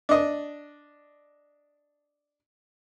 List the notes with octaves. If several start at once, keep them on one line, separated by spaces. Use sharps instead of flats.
D4 D#5